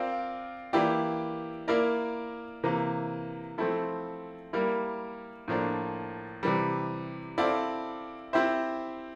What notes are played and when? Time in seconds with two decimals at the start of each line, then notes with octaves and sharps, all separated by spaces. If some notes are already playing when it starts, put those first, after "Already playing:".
Already playing: C4 F4 A#4 D5 F5
0.73 E3 A#3 E4 G4 D5
1.68 A#3 E4 A#4 D5
2.64 C3 E3 A#3
3.58 F3 A3 C4 E4 A4
4.53 G3 A#3 E4 A#4
5.48 A2 F3 A#3 D4
6.43 C3 E3 G3
7.38 C4 E4 A4 D5 F5
8.33 C4 E4 G4 C5 E5